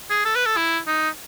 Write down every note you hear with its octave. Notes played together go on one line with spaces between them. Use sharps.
G#4
A4
B4
A4
E4
D#4